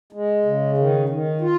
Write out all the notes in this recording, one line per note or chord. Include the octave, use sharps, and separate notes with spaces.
G#3
C#3
D#3
D#3
F4